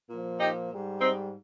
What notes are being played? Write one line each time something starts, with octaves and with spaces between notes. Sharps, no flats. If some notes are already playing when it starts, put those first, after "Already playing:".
A#2 F3
D#4 G4
G#2 G3
C4 D#4